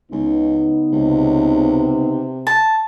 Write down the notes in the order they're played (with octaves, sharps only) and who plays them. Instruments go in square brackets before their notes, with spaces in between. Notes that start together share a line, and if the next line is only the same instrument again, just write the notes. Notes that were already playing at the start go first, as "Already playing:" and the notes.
[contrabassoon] C#2 [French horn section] C#3 B3 D#4
[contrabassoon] C#2 [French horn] C3
[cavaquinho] A5